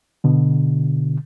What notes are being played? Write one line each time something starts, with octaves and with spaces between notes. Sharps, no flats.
B2 D3